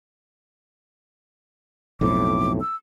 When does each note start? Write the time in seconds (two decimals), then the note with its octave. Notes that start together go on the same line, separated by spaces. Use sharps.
2.01 B1 F2 A2 D6
2.61 E6